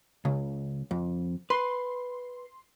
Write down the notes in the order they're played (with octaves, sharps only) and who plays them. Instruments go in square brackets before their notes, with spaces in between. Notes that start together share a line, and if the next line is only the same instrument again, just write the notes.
[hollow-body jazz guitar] C#2 [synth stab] C#3
[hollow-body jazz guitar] F2
[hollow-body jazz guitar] B4 [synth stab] C6